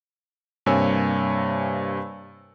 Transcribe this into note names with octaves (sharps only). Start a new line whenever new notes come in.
G2 C3 A#3 C#5 G#5 E6